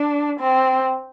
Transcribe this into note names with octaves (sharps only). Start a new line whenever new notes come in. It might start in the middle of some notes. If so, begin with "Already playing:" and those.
Already playing: D4
C4